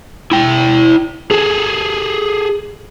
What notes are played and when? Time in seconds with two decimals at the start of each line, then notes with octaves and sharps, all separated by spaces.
0.32 E4 G5
1.31 G#4 A4